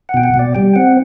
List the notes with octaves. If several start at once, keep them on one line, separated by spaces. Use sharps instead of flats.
F#5
B2 G5
F#5
B2
D5
G3 G5
C4 F#5